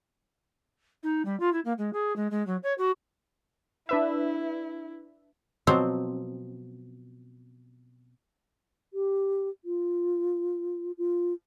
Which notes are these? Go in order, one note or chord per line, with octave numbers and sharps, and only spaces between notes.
D#4
G3
F4
E4
A#3
G#3
G#4
G#3
G#3
F#3
C#5
F#4
D4 E4 B4 E5
B2 F3 F#3 C4
G4
F4
F4